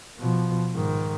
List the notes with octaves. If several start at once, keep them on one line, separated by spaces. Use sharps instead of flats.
B2 F3
G#2 D#3